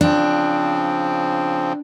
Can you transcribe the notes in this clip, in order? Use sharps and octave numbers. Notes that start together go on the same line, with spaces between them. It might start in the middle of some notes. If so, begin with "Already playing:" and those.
C#3 F3 C4 D4